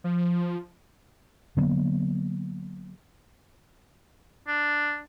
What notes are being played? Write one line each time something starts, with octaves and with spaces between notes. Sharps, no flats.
F3
D3 F#3 A#3 B3
D4